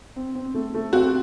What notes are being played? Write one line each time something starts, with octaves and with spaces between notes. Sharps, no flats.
C4
C4
A3
A3
C4 F#4